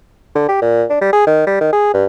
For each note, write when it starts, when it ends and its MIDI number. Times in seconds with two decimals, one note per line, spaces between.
0.35 0.48 50
0.48 0.58 67
0.62 0.84 46
0.90 0.97 62
1.01 1.09 55
1.12 1.27 68
1.27 1.44 51
1.46 1.56 55
1.61 1.70 51
1.73 1.93 68
1.94 2.05 43